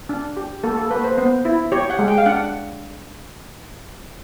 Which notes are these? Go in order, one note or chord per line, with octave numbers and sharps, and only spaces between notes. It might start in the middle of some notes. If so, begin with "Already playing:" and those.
D4
G4
A#3 A4
A4
A#3 B4
C5
B3 C5
E4
G4 C#5
F#5
G#3
G5
F5
D4 F#5